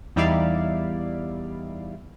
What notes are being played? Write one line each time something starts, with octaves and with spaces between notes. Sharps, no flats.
E2 G3 D#4 E4 D5 F5